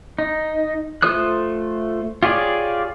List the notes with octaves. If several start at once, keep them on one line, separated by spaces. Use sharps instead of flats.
D#4
A3 F4 C5 D#6 F#6
F4 G4 G#4 C#5 D5